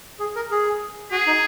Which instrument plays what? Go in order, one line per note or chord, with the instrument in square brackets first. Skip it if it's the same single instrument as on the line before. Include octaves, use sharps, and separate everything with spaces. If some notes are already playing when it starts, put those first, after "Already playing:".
[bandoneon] G#4
A#4
G#4
[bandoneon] F#4 [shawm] G#4
[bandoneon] D#4